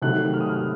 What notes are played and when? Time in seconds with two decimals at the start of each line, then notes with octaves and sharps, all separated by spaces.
0.02 C3 D#3 F#3 A3 F#6
0.33 F6
0.40 D#6
0.49 F6